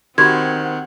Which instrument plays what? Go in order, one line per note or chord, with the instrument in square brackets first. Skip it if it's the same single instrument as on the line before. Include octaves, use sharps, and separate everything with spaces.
[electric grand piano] D#3 [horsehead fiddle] C4 F#5 [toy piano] F#4 G4 B5 [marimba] G#6